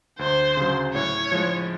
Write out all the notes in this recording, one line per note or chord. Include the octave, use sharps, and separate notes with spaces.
D2 C5
C#3 F#3
A2 C#5
F3 G#3